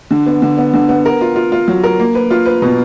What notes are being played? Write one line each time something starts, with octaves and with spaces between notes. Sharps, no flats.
D3
B3
D3
B3
D3
B3
A#4
F4
F4
F4
F#3
A#4
A#3
B4
F4
B4
B2